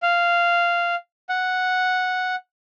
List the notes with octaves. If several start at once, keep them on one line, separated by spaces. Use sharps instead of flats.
F5
F#5